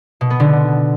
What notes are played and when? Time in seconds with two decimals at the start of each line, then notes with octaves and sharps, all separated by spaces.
0.21 B2
0.30 B3
0.40 D3